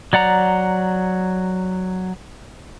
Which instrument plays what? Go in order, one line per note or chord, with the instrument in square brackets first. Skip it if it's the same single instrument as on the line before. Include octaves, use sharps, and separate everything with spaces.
[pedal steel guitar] F#3 D5 F#5 A#5